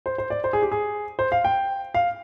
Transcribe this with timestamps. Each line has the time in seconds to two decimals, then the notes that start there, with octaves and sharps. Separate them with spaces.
0.06 C5
0.18 C5
0.30 D5
0.44 C5
0.53 G#4
0.62 G4
0.72 G#4
1.19 C5
1.32 F5
1.45 G5
1.94 F5